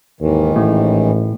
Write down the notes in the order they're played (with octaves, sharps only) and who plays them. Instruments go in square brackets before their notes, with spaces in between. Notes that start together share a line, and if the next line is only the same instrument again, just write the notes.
[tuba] D#2 [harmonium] G#2 D#3 E3
[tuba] A1 [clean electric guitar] A2